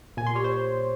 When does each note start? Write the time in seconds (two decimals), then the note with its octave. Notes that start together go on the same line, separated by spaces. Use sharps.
0.17 A#2 G#5
0.27 C6
0.35 G3 C#5
0.44 C5